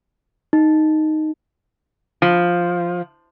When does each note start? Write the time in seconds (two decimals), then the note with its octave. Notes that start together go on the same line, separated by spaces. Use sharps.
0.53 D#4
2.22 F3